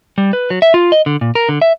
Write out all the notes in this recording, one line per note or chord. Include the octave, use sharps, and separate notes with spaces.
G3
B4
F#3
E5
F4
D#5
D3
A#2
A#4
D3
E5